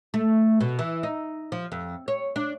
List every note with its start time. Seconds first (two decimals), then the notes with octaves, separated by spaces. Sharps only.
0.14 A3
0.60 B2
0.79 E3
1.03 D#4
1.52 F3
1.72 F2
2.08 C#5
2.36 D4